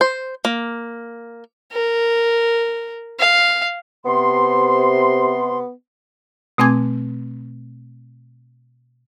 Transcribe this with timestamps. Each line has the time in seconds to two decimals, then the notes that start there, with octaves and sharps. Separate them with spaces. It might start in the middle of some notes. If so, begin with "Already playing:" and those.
0.01 C5
0.45 A#3
1.73 A#4
3.19 F5
4.05 C3 B3 C6
6.58 B2 A3 C4 G#5 D6 G#6